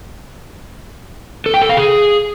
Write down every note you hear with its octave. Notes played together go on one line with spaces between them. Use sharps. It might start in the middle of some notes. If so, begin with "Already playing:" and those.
A4
G5
A4
F5
G#4